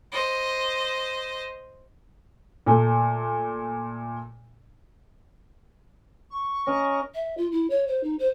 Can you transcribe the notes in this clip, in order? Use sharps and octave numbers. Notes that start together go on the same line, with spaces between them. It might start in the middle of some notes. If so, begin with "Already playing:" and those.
C5 D#5
A#2 A3
C#6
C#4 A#4 D#5
E5
F4
E4
C#5
C5
D#4
C5